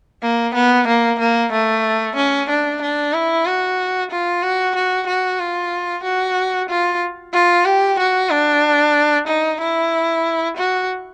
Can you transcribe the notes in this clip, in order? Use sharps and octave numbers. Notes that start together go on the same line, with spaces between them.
A#3
B3
A#3
A#3
A3
C#4
D4
D4
E4
F#4
F4
F#4
F#4
F#4
F4
F#4
F4
F4
G4
F#4
D4
D#4
E4
F#4